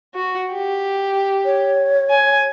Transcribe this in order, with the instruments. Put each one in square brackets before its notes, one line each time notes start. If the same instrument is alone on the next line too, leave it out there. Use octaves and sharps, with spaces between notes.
[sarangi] F#4
G4
[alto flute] C#5
[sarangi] G#5